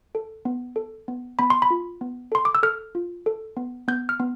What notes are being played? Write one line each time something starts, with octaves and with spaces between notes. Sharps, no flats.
A4
B3
A4
B3
B3 B5
C6
B5
F4
B3
A4 C6
D6
E6
A4 F6
F4
A4
B3
B3 G6
F6
B3